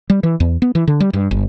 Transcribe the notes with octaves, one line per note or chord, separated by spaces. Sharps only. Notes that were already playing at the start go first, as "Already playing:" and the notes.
G3
E3
E2
B3
E3
D3
G3
G2
G1